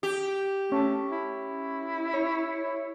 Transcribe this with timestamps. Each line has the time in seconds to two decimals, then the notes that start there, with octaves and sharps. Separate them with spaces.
0.03 G4
0.72 A3 C#4
1.12 E4
2.14 C#5